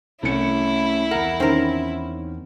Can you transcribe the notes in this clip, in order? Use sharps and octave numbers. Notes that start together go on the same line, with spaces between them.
C2 A3 C#4 E4 C#7
E2 A#4 F#5
D#3 C4 C#4 A#4